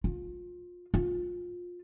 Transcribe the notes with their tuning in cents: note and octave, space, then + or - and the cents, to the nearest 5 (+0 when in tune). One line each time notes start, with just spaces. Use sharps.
F4 +25
F4 +20